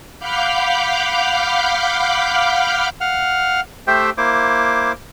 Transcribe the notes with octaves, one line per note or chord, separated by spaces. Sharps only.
F5 F#5 B5 D6 F6 G6
F5 F#5 F6
A3 G4 C5 E5 G5
A#3 E4 C5 D6